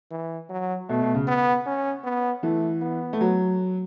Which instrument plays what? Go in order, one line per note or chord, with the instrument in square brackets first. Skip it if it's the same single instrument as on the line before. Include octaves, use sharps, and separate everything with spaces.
[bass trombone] E3
F#3
[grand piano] B2 [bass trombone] A3
[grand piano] B2
C#3
[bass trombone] B3
C#4
B3
[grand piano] E3 [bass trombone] A3
[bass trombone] B3
[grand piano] A3
F#3